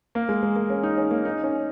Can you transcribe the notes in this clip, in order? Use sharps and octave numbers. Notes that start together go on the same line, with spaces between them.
A#3
G#3
G#3
A#3
C#4
D#4
C#4
A#3
D#4
C#4